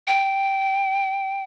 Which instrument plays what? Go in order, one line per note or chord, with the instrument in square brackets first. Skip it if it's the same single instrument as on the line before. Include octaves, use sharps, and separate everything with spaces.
[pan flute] G5